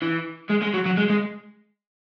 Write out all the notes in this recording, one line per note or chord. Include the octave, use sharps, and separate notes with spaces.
E3
G#3
G#3
F#3
F#3
G#3
G#3